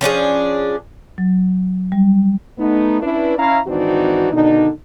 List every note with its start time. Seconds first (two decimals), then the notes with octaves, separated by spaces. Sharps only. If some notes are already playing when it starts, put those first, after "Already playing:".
0.01 F3 C#4 D4 G#4
1.18 F#3
1.92 G3
2.59 A3 B3 D#4
3.02 C#4 D4 E4 B4
3.38 C#4 E4 F5 A#5
3.67 G#1 E3 C4 D4 D#4 F#4
4.33 B2 D3 D#3 D4 D#4